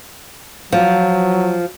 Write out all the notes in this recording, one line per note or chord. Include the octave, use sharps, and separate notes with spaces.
F3 F#3